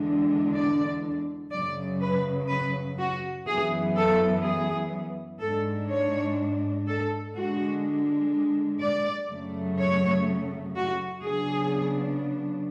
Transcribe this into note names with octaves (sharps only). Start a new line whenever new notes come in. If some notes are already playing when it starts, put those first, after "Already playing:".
Already playing: E2 D3 G#3 D4
D5
F#2 C#3 F#3 D5
B4
B4
F#4
F#2 E3 B3 G#4
A4
G#4
G#2 G#3 D4 A4
C#5
A4
D3 G#3 D4 F#4
D5
F#2 C#3 F#3 A3
C#5
F#4
C#3 F#3 B3 D4 G#4